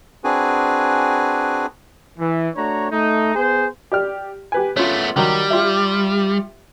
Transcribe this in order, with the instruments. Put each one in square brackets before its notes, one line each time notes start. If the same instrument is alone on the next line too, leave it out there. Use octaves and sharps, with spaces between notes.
[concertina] C4 D4 F#4 G#4 B4 G#5
[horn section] E3
A3 D4 F#4 C#5 A#5
A3 D#4
B3 G#4 C5
[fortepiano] G4 D5 F6
G4 B4 G#5
[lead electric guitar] A3 B3 [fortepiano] C#4 F4
[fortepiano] D#3 F#3 [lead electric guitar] G3
[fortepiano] F4 G4 E5